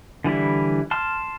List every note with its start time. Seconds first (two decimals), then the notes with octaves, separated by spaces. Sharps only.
0.24 D3 E3 G3 E4
0.91 A5 C6 F6